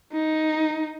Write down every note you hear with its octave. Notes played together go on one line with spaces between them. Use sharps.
D#4